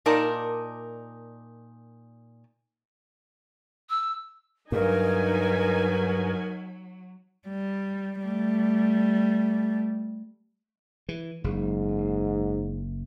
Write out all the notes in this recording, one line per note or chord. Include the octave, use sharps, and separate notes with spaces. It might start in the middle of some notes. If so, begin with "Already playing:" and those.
A#2 D#4 A#4 D5 A5
E6
G2 F#3 D#4 A#4 G#5
G3
G3 A3
E3
F#1 G#2